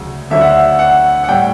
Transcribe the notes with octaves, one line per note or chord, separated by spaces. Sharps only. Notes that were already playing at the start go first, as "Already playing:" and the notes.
Already playing: D2 C#3 F#3
D2 D3 F#3 E5
F#5
E5
F#5
F#5
A2 G3 G5